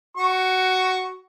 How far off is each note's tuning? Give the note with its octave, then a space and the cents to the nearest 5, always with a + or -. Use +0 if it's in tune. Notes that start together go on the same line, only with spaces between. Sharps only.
F#4 +10 C#6 +0